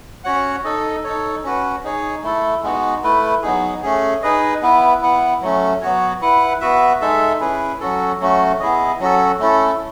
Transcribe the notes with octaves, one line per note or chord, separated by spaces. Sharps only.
C#4 F#4 C#5 F#5
D#4 A4 D#5
D#4 A4 C#5
C#4 F#4 B4
D#4 G#4 C#5
A3 E4 A4
G#3 B3 D#4 F#4
A3 E4 B4
F#3 B3 D#4 G#4
A3 C#4 G#4
D#4 G#4 B4 D#5
B3 E4 B4
B3 E4 B4 F#5
F#3 A3 C#4
F#3 B3 F#4 C#5
E4 B4 F#5
B3 F#4 B4 E5
G#3 D#4 A4 E5
C#4 E4 G#4 B4
F#3 C#4 F#4 A4
F#3 A3 C#4 F#4
B3 E4 G#4 D#5
F#3 C#4 F#4 A4
A3 C#4 E4 A4